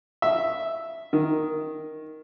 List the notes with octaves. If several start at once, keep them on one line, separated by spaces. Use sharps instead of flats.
E5
D#3